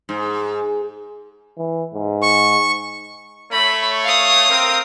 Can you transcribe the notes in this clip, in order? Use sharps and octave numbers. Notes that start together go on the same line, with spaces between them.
G#2
E3
G#2
C#6
A3 C#5 B5
F5 D#6
C4 A#4